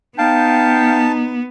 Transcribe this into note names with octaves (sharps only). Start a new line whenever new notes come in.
B3 D#4 F5 G5 A5